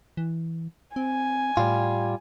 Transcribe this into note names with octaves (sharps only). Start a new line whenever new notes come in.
E3
C4 G#5
A2 G3 F4